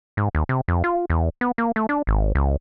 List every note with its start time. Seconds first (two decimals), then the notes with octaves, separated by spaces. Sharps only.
0.17 G#2
0.35 D#2
0.49 C3
0.68 F2
0.84 F4
1.10 E2
1.41 B3
1.58 A#3
1.76 A3
1.89 D4
2.07 G#1
2.35 C#2